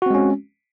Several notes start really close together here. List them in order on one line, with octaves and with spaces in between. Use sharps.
F#4 C4 G#3 C#4